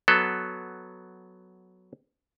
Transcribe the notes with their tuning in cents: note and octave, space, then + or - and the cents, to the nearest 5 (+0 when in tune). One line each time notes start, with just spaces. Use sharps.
F#3 +0 B3 +5 A4 +0